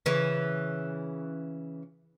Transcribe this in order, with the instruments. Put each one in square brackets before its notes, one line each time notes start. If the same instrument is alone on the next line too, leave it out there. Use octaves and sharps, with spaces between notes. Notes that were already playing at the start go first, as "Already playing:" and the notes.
[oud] C#3 E3